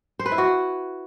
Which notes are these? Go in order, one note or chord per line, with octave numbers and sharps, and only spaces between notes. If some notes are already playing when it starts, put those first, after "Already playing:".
C5
B4
E4
F#4